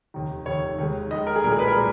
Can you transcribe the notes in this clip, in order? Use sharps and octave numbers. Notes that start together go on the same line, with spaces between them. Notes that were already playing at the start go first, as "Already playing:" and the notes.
F1 D#2 D#3
F1 D#2 D#3 C#5
D#2 D#3 G#3
D#2 D#3 G#3 D#5
A#4
G#4
B1 A#2 G#3 A#4
G#4
B4
A#4
A#2 G#3